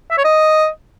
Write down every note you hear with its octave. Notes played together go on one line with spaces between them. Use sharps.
E5
C#5
D#5